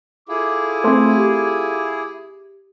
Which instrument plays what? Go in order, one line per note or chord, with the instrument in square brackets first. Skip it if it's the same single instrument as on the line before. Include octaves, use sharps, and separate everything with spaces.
[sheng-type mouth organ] E4 G#4 [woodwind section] F4 A4 D6
[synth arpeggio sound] A3 C4 [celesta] C6
[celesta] G4